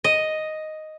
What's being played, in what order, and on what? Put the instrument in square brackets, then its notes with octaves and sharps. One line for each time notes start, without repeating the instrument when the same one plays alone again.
[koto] D#5